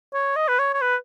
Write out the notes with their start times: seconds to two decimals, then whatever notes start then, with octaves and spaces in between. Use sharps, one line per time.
0.13 C#5
0.36 D#5
0.48 B4
0.59 C#5
0.74 C#5
0.81 B4